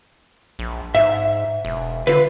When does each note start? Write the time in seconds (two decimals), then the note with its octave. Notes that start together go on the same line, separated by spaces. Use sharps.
0.59 A#1
0.95 G#2 E5
1.65 E1
2.07 D3 F4 B4